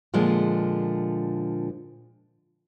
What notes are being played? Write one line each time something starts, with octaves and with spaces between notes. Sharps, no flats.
A#2 D3 F3 G#3